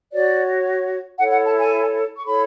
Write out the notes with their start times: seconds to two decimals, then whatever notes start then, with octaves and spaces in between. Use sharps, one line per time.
0.11 F#4 C#5 D5
1.18 E4 A4 C#5 F#5
1.32 F#5
1.45 A5
1.59 G#5
2.16 C#6
2.25 E4 A4 C#5 B5